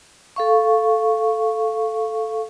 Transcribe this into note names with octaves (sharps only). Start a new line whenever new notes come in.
A4 F5 C#6